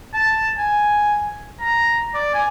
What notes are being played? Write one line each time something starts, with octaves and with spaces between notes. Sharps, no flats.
A5
G#5
A#5
D5
G#5